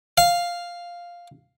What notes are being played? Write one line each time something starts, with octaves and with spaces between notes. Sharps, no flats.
F5